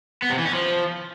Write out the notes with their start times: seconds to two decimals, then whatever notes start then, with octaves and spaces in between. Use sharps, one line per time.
0.22 B3
0.30 C3
0.38 E3
0.45 C#4
0.53 F3